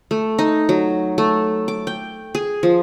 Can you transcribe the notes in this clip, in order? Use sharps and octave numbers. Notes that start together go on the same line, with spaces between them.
A3
D#4
F#3
A3
D6
G5
G#4
F3